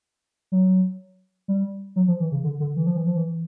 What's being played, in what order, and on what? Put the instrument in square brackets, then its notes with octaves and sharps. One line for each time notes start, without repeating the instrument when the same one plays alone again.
[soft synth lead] F#3
G3
F#3
F3
E3
C#3
D3
D3
E3
F3
E3
F3
E3